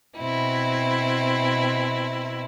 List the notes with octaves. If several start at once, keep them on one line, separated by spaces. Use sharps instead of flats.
B2 C4 E4